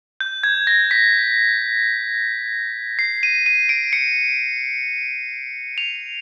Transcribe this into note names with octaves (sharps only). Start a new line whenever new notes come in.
G6
G#6
A#6
B6
C7
D#7
D#7
D7
C#7
F7